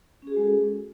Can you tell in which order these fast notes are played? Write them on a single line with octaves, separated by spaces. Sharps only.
C#4 G#4 F#4 G#3 A4